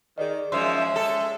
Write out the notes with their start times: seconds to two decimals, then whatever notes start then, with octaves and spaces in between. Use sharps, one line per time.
0.18 D#3 G#4 D5 D#5
0.52 F#2 F3 G#3 C#4 E5 C6
0.96 A4